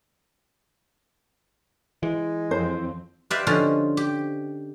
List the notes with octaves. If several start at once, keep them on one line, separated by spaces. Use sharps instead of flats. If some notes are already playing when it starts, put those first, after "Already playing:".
E3 G#3
F2 C4 C5
G4 B4 C5 D5 E5 F5
D3 F3 C#4 D#4 F4
G4